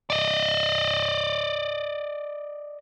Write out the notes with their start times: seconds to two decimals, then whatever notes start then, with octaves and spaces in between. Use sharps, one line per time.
0.10 D5 D#5